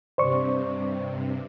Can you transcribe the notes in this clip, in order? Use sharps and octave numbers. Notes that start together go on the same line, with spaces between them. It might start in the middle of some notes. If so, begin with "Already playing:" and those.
G2 C3 C5 D5 C#6